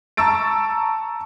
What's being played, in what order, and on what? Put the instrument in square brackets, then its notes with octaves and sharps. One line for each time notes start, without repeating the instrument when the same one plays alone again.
[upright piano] A5 A#5 C#6 E6 A6 D7